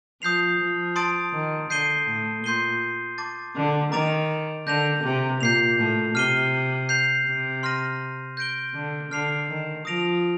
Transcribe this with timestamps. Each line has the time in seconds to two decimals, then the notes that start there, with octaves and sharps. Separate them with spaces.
0.22 F3 D#6 G6 C7 F7
0.59 F3
0.96 A5 C6 D#6 A6 D7
1.33 D#3
1.70 D3 G6 C7 D#7 G7
2.07 A2
2.44 A#2 C6 G6 C7 D#7 G7
3.18 A5 D6 A6
3.56 D3
3.92 D#3 A#5 D6 A6 D7 F7
4.67 D3 G6 A#6 F7
5.04 C3
5.41 A#2 G6 C7 F7
5.78 A2
6.15 C3 F6 C7 D#7 G7
6.89 G6 C7 F7
7.26 C3
7.63 C6 F6 A#6 D#7
8.37 G6 A#6 D7 G7
8.74 D3
9.11 D3 F6 C7 F7
9.49 D#3
9.85 F3 D#6 A#6 D7 F7